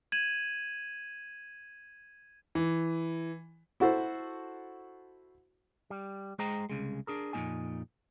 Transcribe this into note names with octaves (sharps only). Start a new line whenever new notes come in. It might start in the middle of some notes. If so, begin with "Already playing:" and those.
G#6 D#7 E7 F#7
E3
E4 F#4 A4 C5
G3
G#3 G#4 C5 D#5 G5 A#5
C2 C#3 G#3
D4 G#4 A#4
F2 A#2 A3 C4 D#4 G#5